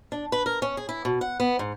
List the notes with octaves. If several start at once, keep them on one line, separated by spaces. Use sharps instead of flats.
D4
B4
A#4
C#4
G#4
E4
B2
F#5
B3
G#2